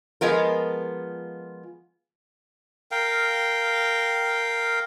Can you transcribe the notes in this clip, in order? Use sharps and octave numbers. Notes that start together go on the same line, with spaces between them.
F3 G#3 B3 F4 A#4
A#4 F5 G5